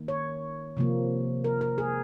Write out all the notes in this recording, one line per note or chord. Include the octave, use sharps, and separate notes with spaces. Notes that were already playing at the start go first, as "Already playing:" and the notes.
Already playing: D#3 A#3
C#5
C3 F3 A#3
A#4
A#4
G#4